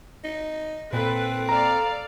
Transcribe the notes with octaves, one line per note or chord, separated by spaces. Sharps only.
D#4
A#2 C4 A4 B4
A4 D5 F5 A#5